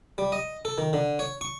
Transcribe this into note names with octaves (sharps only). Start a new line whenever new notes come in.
G3
D#5
A4
D#3
D3
C#5
C#6